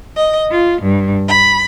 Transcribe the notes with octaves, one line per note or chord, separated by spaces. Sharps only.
D#5
F4
G2
B5